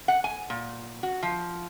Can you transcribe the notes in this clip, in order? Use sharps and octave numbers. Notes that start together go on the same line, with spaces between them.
F#5
G#5
A#2
F#4
F3